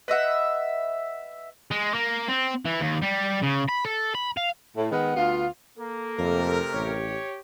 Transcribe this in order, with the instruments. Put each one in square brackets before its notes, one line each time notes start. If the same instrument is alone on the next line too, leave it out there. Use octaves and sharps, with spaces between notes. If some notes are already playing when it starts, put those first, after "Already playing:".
[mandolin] B4 D#5 E5 F#5
[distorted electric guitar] G#3
A#3
C4
E3
D#2
G3
C#3
B5
A4
B5
F5
[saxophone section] A2
D#3 G#3 B3
D2 B3 F4
[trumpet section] A#3 [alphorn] A4
[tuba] F2 [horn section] C3 A3 A#4
[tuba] A1 [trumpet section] G4 C#5